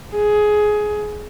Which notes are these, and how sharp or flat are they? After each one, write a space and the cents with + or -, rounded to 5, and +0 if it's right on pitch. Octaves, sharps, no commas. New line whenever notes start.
G#4 +15